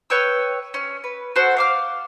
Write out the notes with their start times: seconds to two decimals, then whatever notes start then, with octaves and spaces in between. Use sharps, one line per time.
0.10 B4 C#5 G5 E6
0.74 C#4
1.04 B4
1.36 F#4 A4 C5
1.57 F5 D6 F6